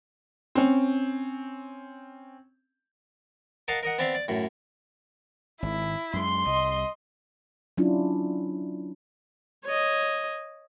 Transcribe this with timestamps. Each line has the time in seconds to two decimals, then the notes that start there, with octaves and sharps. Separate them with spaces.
0.55 C4 C#4
3.68 A#4 D#5 F5 F#5 A5
3.83 A#4 D#5 F#5
3.98 B3 C4 D5 E5 F5
4.15 D5
4.28 F#2 A2
5.62 G#1 E4
6.13 F#2 G#3 C6
6.46 C2 D#5
7.78 F#3 C#4 D4 E4 F4
9.65 C#5 D#5